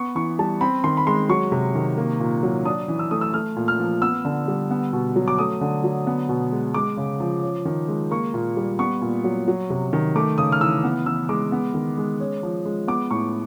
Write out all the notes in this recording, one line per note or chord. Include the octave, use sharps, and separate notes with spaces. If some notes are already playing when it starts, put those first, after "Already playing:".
Already playing: B3 C#6
E3 C#6
G3 A5
C4 B5
D#3 C6
B5
G#3 C6
F#3 C#6
C3
D#3
A#3
A#2
F#3
D4 D#6
E3
E6
A3 D#6
E6
A3 F6
A#2
F6
F3
B3 E6
D3
G3
B3
B2
F#3
D6
A3 D#6
D3
F#3
B3
B2
G#3
G#3 D6
C#3
F3
C#4
D#3
G#3
A#3 C#6
A#2
G3
B3 C#6
A#2
F#3
F#3
C3
D#3
A3 D6
C#3 D#6
F6
E3 E6
B3
E3 E6
G#3 D6
B3
D#3
G#3
C#4
F3
G#3
B3 D6
A2 C#6